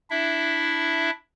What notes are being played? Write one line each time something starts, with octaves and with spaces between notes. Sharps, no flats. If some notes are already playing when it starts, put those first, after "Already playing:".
D4 E4 E5